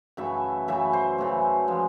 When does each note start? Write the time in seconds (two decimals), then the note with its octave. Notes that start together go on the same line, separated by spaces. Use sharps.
0.17 F#2 C#3 E3 A3 E5
0.68 F#2 C#3 E3 A3 E5
0.93 C5
1.18 F#2 C#3 E3 A3
1.68 F3 G#3